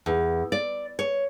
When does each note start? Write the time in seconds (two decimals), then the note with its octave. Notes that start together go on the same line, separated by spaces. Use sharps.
0.06 E2
0.52 D5
0.99 C#5